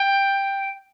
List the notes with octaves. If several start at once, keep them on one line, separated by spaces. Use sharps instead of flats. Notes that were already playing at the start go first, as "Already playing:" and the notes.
Already playing: G5